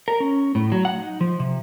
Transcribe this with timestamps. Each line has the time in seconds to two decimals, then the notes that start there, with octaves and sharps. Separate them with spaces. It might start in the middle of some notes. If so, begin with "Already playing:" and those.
0.08 A#4
0.20 C#4
0.55 A2
0.72 F#3
0.85 F#5
0.98 D#4
1.21 F3
1.40 C3